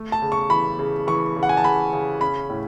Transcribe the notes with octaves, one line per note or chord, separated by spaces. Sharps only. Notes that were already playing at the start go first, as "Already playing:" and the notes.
Already playing: A3
A5
C#3
C#6
E3 B5
C#3
E3 C#6
C#3
F#5
G#5
A5
C#3 B5
C#3
C#4 B5
A2